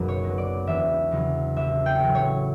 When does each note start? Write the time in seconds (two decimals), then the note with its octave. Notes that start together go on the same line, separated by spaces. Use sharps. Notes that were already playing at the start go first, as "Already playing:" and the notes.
Already playing: F#1 B1 F#2 F#3
0.08 C#5
0.23 B2 F#3
0.38 D5
0.67 E1 E5
1.11 E2 C#3 F#3
1.56 A1 E5
1.86 G5
2.00 A2 F#3
2.15 C#5